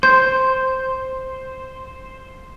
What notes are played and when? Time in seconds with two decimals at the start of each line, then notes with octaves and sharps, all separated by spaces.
0.03 C5 G6